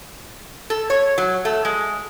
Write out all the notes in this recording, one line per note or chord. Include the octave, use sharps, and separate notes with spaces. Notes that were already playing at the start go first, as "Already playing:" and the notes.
A4
C#5
F#3
A3
G#3